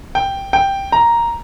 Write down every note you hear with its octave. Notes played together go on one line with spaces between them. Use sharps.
G5
G5
A#5